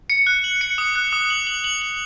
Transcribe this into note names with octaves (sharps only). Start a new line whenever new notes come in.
C#7
F#6
F#7
C#7
D#6
F#6
D#6
F#7
F#7
F#7
F#7